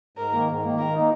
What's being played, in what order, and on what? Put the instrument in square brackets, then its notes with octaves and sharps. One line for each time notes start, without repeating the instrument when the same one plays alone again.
[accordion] G#2 [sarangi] A#4
[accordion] D#3 A#3
G#2
D#3 A#3
[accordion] D#3 [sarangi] A#4
[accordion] A#3 D#4